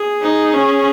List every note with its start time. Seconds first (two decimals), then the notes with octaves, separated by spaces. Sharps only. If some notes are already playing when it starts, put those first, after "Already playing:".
Already playing: G#4
0.22 D#4
0.54 C#4